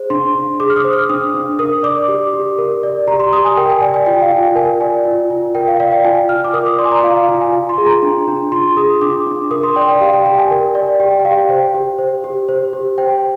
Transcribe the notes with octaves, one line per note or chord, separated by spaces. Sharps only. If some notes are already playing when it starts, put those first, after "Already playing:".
Already playing: G#4 C5
D4 C6
D4
G#4 D6
F6
D#6
C5
F6
D4 D#6
D4
A#4 D#6
D5 D6
G4
G4
A#4
D5
G4 A#5
C6
G4 D#6
G#5
A#4 G5
G#5
D5 G#5
G#5
F4 G5
F5
F4 G5
A#4 G#5
D5 G#5
F4
F4
A#4 G5
F5
D5 F5
G5
F4 G#5
F4 F6
D6
A#4 D#6
D6
D5 C6
G#5
A#5
F4 F5
F5
F4 F5
G#5
F4
C6
G#4
A#5
D4
D4
F4 C6
G#4 D#6
D4 D6
D4
A#4 D#6
C6
D5 G5
G5
G4 F5
G5
G4 G5
G#5
A#4
D5
G4 G5
G5
G4 F5
C5 G5
G4
C5
G4
C5
G4
C5 G5